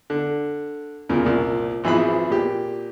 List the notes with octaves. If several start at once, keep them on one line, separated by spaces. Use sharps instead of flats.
D3
D2 A#2 C#3 A#3 A#4
C2 A#2
G#1 E3 F3 G#4 B4 B5
A#2 G4